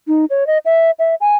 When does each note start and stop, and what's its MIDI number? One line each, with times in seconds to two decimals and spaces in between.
0.08 0.25 63
0.30 0.46 73
0.47 0.58 75
0.65 0.91 76
0.99 1.15 76
1.21 1.36 80